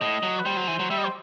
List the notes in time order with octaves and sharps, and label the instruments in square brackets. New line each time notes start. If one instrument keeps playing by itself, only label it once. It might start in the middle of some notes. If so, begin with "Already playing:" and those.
[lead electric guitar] A2 [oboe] D#5
[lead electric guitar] F#3
[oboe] B4
[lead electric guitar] G3 [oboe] C5
[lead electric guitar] F#3
E3
F#3
[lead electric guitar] G3 [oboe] E5
[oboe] D#5
C5